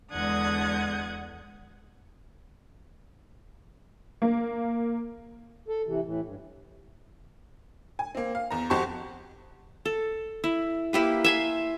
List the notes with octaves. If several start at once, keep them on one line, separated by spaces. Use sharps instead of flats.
E2 D3 G#3 F#5 D#6 G#6
A#3
A4
C3 E3
A2 E3
G2
G#5
A#3 C4
F5
E2 A#5
F2 F#4 G4 C5 A5 C#6
A4
E4
A#3 E4 G4 B4
E5 G#5 C6